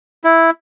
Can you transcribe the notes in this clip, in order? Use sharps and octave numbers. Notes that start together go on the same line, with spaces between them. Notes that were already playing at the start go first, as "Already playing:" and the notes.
E4